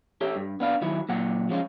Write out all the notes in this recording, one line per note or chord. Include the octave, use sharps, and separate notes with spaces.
G4 A4 C#5 E5
G2
B3 D4 F5
D#3 F#3 E4
A#2 F#3 F#5
F3 G#3 C#4 F4